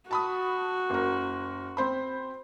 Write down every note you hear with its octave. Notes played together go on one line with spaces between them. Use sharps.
F#4 A5 B5 D#6
F#1 A#4
C4 C5 B5